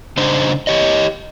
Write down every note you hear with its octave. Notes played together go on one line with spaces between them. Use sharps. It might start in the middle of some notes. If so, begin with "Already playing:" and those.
C#3 D4 D#4 C5
G4 C#5 D#5